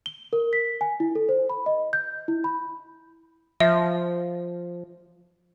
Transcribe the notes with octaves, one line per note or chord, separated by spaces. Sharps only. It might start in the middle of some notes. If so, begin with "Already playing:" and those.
G7
A#4
B6
G#5
E4
A4
C5
B5
D#5
G6
E4
B5
F3 E5